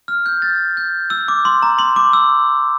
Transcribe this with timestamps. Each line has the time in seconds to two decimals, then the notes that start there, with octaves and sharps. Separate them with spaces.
0.08 F6
0.26 G6
0.42 A6
0.77 G6
1.10 E6
1.28 D6
1.45 C6
1.63 A#5
1.79 C6
1.96 D6
2.13 E6